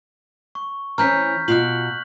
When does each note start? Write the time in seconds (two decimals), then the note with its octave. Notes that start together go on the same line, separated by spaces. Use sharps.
0.55 C#6
0.98 E3 C4 C#4 A#5 F6 G6 B6
1.48 B2 F4 F#6 F#7